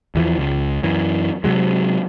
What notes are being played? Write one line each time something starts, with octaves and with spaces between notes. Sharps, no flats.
E2 E3 F3
C#2
F#2 E3
C3 F#3 G#3